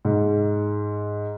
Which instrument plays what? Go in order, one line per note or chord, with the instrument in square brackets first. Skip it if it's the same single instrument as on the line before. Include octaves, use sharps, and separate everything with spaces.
[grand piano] G#2